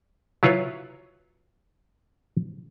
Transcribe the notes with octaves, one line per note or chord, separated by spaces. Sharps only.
F#3 E4 F4 B4 C#5